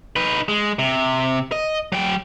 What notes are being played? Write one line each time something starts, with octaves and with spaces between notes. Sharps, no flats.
D#4 B4
G#3
C3
D#5
F#3 G5